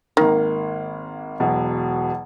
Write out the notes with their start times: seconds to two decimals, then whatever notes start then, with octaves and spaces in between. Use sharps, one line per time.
0.17 G#1 D#3 A#3
1.40 E1 B2 F#3